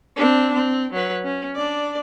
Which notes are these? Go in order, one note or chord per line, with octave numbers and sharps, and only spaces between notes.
C4 D4
C4
F#3 B4
C#4
D4 D5